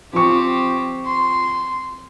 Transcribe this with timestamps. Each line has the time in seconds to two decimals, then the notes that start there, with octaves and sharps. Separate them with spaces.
0.13 F3 C4 G4 C#6
1.06 C6